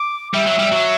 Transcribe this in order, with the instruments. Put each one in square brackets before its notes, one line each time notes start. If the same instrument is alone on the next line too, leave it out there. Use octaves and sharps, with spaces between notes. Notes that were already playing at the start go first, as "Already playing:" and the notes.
Already playing: [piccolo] D6
[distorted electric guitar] G3 [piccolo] E5
[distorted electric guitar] F#3
G3
F#3